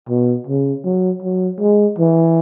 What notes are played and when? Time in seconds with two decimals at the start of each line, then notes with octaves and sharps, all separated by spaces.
0.09 B2
0.47 C#3
0.84 F#3
1.22 F#3
1.60 G#3
1.98 E3